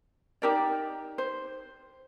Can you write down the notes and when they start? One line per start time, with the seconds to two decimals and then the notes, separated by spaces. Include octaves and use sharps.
0.42 D#4 G4 A#4 D5
1.18 C5